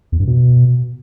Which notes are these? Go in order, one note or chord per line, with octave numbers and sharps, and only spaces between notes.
E2
G2
B2